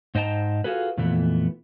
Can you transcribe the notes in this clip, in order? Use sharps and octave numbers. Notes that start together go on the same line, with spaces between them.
G#2 C5 D#5 G5 A5 A#5
F4 F#4 G#4 A4 B4
F2 A#2 E3 A3 B3